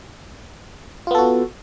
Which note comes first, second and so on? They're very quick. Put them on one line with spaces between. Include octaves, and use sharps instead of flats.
F4 B3 A4 F#4